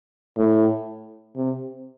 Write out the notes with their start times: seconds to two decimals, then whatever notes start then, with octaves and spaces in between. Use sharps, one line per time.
0.37 A2
1.36 C3